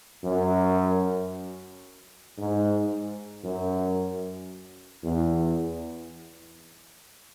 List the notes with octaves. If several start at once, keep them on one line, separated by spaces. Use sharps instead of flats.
F#2
G#2
F#2
E2